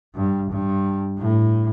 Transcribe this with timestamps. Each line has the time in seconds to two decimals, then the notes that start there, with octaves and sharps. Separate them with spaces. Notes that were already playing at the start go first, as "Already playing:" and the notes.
0.15 G2
0.50 G2
1.19 A2